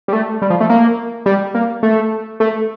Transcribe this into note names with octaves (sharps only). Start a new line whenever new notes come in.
G3
A3
G3
F3
A3
A#3
G3
A#3
A3
A3